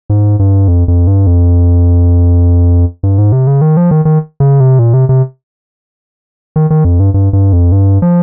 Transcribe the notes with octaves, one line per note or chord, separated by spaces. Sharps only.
G#2
G2
F2
F2
G2
F2
G2
G#2
C3
C#3
D#3
F3
D#3
D#3
C#3
C3
A#2
C3
C3
D#3
D#3
F2
G2
G2
G2
F2
G2
F3